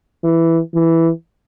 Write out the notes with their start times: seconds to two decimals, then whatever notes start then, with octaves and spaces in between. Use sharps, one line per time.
0.24 E3
0.75 E3